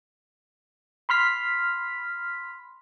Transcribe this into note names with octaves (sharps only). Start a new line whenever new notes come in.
B5 C6 F6 B6